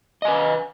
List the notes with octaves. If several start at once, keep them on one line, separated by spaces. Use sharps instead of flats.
B4 D#5 G#5